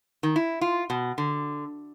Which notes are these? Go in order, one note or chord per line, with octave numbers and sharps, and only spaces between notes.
D#3
E4
F4
B2
D3